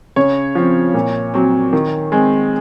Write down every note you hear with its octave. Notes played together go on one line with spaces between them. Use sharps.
C#3 C#5
F3 C4
A#2
F#3 C4
D#3
G#3 C4